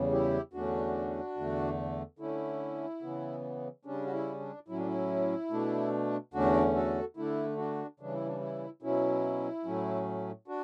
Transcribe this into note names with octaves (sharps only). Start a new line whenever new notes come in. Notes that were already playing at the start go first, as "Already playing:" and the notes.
Already playing: E2 C#3 G3
E4 G4
E2 D3 A3 C#4 D4 F#4
E2 D3 A3
D3 A3 C#4 E4
C#3 E3 B3
C#3 G3 C#4 D4
F#4
E4
D4
A2 F#3 C#4 E4
D4
E4
B2 A3 D4
E2 D3 A3 C#4 D4 F#4
F#4 A4
D3 A3 D4 E4
D4 F#4
C#3 E3 G3 D4
E4
D4
E4
B2 F#3 C#4 E4
A2 F#3 A3 C#4
D4 F#4